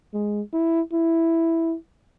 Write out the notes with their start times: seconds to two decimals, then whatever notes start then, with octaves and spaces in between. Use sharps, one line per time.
0.14 G#3
0.53 E4
0.93 E4